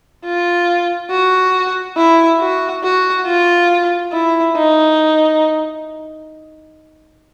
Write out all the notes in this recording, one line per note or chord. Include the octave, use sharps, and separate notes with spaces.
F4
F#4
E4
F#4
F#4
F4
E4
D#4